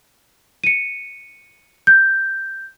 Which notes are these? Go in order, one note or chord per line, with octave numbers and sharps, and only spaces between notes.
C#7 D#7
G6